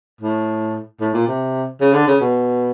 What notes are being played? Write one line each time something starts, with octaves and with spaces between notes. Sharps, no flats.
A2
A2
A#2
C3
C#3
D3
C#3
B2